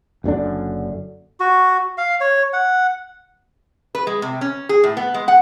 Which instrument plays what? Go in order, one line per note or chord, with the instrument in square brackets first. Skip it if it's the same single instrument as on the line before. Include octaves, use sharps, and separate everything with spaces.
[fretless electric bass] F#1 F#2 D3 D4
[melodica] F#4
F5
C#5
F#5
[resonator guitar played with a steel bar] B4
G#3
C3
C#4
G#4
A2
B3
G#3
F#5